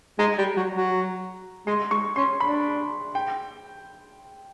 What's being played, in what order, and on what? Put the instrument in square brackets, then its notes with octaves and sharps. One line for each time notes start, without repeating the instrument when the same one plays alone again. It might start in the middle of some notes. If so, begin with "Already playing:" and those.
[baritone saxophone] G#3 [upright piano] A#5
[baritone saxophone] G3
F#3
F#3
[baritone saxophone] G#3 [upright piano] C6
[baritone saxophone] G#3 [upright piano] C#6
[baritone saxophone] C#4 [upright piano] C6
[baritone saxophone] D4 [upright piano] B5
[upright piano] G5